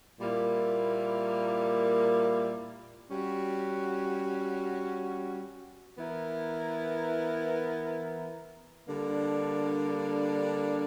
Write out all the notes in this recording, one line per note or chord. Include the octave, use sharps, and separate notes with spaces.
A#2 G3 A#3 E4
G3 C#4 F#4
E3 B3 E4 A#4
D3 G3 A#3 D4